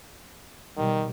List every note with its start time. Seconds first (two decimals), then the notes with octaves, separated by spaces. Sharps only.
0.78 B2 D#3 G3